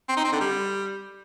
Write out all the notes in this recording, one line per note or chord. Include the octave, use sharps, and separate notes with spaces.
C4
D#4
C4
D3
G3